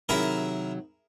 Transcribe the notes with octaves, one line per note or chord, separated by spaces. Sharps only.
C3 D#3 F#3 E4 G#4 A#4